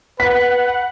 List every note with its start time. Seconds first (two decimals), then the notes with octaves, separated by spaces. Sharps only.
0.20 B4 F#5 B6